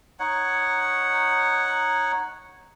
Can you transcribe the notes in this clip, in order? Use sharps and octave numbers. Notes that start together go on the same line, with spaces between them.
D#4 C#5 F#5